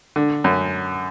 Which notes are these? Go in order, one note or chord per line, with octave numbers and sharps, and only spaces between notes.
D3
F#2